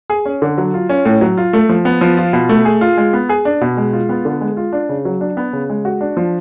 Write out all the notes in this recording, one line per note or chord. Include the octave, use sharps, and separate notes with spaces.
G#4
C#4
D3
F#3
F4
C#4
A2
F#3
F4
A3
F3
B3
F3
F4
B2
A3
G#4
F4
G#3
B3
G#4
D4
B2
G#3
F4
B3
D3
G#3
F4
D4
C#3
F#3
D4
B3
C#3
G#3
F#4
D4
F3